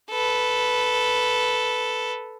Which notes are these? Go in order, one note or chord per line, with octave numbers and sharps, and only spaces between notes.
A4 B4